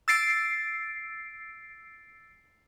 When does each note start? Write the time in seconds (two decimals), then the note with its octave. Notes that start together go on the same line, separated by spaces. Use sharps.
0.08 E6 A6 C7 D7